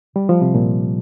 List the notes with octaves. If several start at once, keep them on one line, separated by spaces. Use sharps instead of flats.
G3
F3
C3
A#2